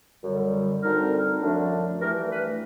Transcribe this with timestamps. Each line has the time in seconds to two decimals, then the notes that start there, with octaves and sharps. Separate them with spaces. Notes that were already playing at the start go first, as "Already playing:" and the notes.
0.24 F#2 D3 G3
0.83 D2 D3 G3 C4 D#4 A#4
1.41 F#2 D3 F3 A3 D4
2.00 G2 E3 A3 A#4
2.30 B4